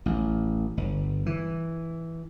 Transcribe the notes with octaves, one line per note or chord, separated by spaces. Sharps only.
A1
G1
E3